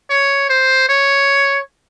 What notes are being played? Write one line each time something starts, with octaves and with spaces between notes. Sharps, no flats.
C#5
C5
C#5